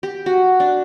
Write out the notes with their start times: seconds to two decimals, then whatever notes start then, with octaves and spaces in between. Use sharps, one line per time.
0.03 G4
0.26 F#4
0.60 D4